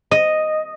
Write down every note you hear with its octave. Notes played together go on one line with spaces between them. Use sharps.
D#5